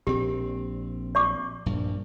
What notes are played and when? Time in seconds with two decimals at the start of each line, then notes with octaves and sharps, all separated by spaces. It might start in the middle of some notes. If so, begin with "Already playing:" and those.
0.07 A#1 C4 G4
1.15 D5 C#6 D6
1.66 A#1 G2